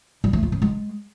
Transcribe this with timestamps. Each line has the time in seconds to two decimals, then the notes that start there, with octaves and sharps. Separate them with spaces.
0.24 G3
0.33 A3
0.43 F4
0.52 C#4
0.62 G#3